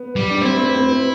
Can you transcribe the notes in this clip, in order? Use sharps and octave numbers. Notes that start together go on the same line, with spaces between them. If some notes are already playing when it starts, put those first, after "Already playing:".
Already playing: B3
G3
D4
C4 E4
C4
C4
C4